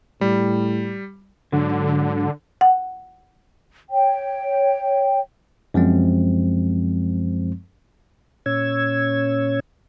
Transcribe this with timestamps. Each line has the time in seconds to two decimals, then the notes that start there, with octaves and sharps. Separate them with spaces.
0.21 A2 G3
1.52 G#2 D3 F#3
2.61 F#5
3.91 C#5 G5
5.74 F#2 F3 G#3 C4
8.46 A#2 C#4 C#5 E6 G#6